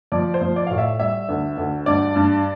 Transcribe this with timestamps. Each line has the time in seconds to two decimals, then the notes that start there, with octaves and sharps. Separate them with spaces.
0.12 F3 D5
0.34 C5
0.41 F3
0.56 D5
0.67 A2 F5
0.78 E5
1.00 G3 E5
1.29 D2
1.58 D2
1.86 G2 D5
2.16 G2